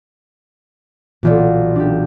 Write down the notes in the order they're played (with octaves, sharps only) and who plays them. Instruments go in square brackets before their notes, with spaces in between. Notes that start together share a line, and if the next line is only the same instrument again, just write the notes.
[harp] B1 E3 [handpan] A#2 F4 D5
[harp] D4 G4